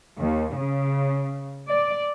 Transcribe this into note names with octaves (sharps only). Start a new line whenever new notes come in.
D#2
C#3
D5